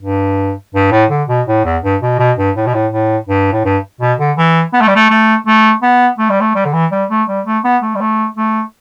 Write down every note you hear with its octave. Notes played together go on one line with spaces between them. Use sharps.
G2
G2
A2
D3
B2
A2
E2
G2
B2
B2
G2
A2
B2
A2
A2
G2
A2
G2
B2
D3
E3
B3
A3
G3
A3
A3
A3
B3
A3
G3
A3
G3
D3
E3
G3
A3
G3
A3
B3
A3
G3
A3
A3